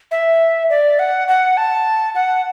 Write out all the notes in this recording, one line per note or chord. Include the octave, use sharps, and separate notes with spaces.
E5
D5
F#5
F#5
A5
F#5